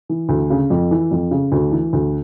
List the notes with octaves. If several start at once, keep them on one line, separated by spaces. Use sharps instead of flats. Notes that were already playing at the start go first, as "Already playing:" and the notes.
E3
D2
C#3
F2
E3
F2
C#3
D2
E3
D2